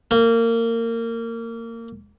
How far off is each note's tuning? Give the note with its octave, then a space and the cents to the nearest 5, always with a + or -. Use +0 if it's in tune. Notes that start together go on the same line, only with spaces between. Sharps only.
A#3 -25